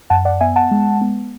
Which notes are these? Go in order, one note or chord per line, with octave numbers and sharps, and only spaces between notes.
F#2 F#5 A5
D5 F#5
B3 E5 G#5
F#5 A5
G#3
B3